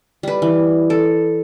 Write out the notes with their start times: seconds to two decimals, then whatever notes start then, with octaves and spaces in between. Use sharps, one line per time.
0.23 G3 B4
0.42 E3
0.90 A4